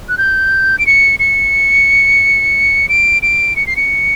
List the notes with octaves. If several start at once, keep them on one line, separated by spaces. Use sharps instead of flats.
F#6
G6
D7
C#7
C#7
D7
D7
C#7
C7
C#7